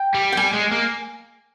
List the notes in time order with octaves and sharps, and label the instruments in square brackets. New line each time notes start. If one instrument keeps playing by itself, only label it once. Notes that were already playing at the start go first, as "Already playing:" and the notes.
Already playing: [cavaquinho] G5
[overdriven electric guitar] G3
[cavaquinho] G5
[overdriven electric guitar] G3 [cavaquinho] G#5
[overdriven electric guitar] G#3
A#3